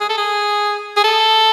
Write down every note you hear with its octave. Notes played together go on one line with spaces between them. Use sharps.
G#4
A4
G#4
G#4
A4